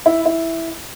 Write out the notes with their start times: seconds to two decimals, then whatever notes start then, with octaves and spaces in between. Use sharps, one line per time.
0.06 E4
0.26 E4